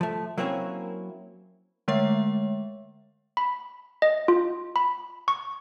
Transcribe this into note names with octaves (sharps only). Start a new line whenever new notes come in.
F3 A3
F#3 A#3 C4 C#4 E4 C#5
D3 G#3 A3 C#5 E5
B5
D#5
F4
B5
C#6